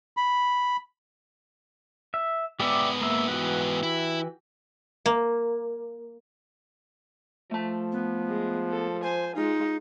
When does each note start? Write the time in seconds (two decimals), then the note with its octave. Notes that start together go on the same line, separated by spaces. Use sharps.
0.17 B5
2.14 E5
2.60 G#2 B3 G4 D5 E5
3.02 A#3 E5
3.28 E3 F#4 G4
3.83 E4
5.06 A#3
7.51 F3 A3 A5
7.92 B3
8.28 G#3
8.71 A4
9.03 C5 G#5
9.36 G#3 D#4 F4